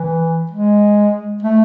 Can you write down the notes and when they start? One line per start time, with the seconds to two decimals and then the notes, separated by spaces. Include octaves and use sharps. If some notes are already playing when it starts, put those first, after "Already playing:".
Already playing: E3
0.51 G#3
1.42 A3